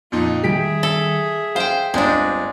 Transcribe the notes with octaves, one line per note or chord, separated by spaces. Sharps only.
F2 A#2 D#4 F4
D#3 G3 G4 G#4 E5 B6 D7
A4
C5 F5 G5
G1 G#3 C4 D4 D5